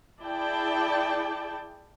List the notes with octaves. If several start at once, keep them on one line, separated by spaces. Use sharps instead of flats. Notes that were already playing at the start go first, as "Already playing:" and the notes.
E4 G#4 D5 G5 A5